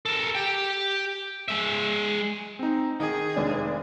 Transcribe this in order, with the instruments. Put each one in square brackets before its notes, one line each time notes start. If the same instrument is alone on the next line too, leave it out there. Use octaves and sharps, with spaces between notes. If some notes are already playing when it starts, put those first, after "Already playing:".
[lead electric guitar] A4 A#4
G4 G5
G#3 E5
[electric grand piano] C4 D#4
[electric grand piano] D#3 [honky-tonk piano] D#4 [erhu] G#4
[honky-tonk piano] F1 G#3 D4